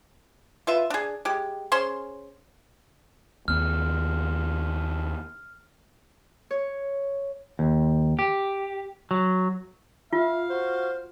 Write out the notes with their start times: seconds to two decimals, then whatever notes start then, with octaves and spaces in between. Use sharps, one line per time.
0.67 F4 B4 E5
0.90 D4 G#4
1.25 G#3 G4
1.72 C#4 G#4 C5 C6
3.48 D#2 B3 F6
6.51 C#5
7.59 D#2
8.19 G4
9.11 F#3
10.13 F4 E5 F5
10.50 F#4 C5